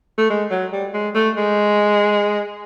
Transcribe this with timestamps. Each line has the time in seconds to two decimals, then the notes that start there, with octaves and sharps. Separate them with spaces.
0.18 A3
0.30 G#3
0.51 F#3
0.73 G3
0.94 G#3
1.15 A3
1.37 G#3